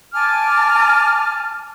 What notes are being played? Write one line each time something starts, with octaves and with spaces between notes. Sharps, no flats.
G#5 A5 D6 F6